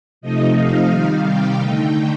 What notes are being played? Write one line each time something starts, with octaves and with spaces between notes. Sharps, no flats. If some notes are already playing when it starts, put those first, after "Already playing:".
C3 F3 A3 D#4 D#5
F5
C3 D#3 G3
G5
D3 A3 D#4